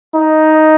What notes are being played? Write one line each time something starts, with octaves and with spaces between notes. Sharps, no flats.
D#4